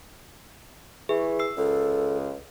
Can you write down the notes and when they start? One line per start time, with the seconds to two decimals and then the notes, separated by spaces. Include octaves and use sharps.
1.09 E3 G#4
1.39 E6 C7
1.58 C#2 A4